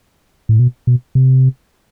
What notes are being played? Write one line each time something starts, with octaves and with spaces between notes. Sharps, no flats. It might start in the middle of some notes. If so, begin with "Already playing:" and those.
A2
B2
B2
C3